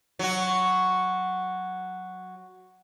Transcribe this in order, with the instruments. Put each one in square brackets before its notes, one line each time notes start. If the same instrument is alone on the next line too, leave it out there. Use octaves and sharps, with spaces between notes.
[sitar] F#3 F#4